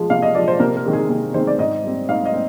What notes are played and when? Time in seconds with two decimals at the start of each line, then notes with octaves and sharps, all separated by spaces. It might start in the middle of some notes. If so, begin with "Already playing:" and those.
Already playing: F3 G#3
0.10 C3 F5
0.22 D#5
0.35 F3 G#3 D5
0.48 C5
0.60 C3 A#4
0.76 A#4
0.85 D#3 G#3 C4
0.93 G#4
1.09 C3 G#4
1.34 D#3 G#3 C4 C5
1.47 D5
1.59 G#2 D#5
1.84 G3 C4
2.09 G#2 F5
2.26 D#5
2.34 C4